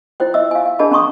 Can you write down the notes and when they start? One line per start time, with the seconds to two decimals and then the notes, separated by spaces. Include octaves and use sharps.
0.20 E4 F4 C5 G5
0.34 D#5 E5 E6
0.51 F5 G#5
0.66 F5
0.79 D4 G#4 A#4 D#5 A5 B5
0.91 C#4 A#5 C6 C#6 D#6